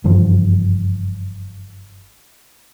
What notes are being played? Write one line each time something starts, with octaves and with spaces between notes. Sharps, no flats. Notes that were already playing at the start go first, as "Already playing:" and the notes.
F#1 G2 E3 F3